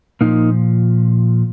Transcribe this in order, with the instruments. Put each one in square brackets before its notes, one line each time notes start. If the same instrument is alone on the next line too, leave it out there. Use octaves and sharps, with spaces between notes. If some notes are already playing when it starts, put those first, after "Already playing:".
[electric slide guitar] A#2 F3 A#3 D#4